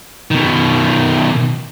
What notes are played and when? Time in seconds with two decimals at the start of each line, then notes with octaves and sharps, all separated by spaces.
0.31 B2 D#3